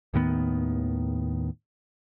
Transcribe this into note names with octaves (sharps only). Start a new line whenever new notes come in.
D#2 A2 D#3 B3